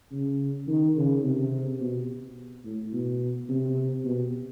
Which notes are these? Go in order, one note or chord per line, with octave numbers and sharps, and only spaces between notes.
C#3
D#3
C#3
C3
B2
A2
B2
C3
B2